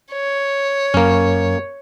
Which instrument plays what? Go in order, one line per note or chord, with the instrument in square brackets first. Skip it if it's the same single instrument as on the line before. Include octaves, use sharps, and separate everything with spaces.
[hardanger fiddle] C#5
[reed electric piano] F#2 [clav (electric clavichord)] A#3 C#4